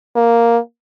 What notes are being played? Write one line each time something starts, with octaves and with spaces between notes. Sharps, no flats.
A#3